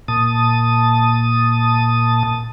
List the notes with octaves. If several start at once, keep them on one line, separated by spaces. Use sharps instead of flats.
A#2 A5 D#6